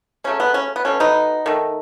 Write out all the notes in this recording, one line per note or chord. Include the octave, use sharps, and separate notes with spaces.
C#3 F#3 A3 C#4
B3
C#4
B3
B2 A3 C#4
B3 D#4
D#3 A3